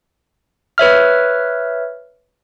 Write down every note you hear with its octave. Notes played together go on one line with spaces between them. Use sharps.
B4 C#5 E5 F6